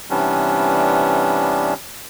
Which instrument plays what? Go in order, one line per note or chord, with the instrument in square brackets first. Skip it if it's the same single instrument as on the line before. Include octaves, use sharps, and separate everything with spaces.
[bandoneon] C3 E3 G3 B3 C#4 D4